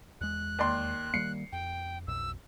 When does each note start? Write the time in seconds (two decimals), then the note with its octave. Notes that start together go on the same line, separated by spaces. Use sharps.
0.21 E2 G#3 F#6
0.59 D#2 D5 C6
1.14 D#3 G3 A#3 C7 C#7
1.52 F2 G5
2.07 B1 F2 B2 E6